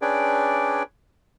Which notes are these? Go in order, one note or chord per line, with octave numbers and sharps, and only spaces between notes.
C#4 D4 G#4 B4 D5 G5